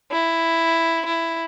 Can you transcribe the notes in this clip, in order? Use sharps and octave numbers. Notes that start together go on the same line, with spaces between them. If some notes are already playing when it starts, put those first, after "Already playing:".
E4
E4